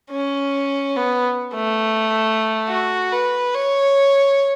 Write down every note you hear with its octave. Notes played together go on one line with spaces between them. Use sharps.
C#4
B3
A3
F#4
B4
C#5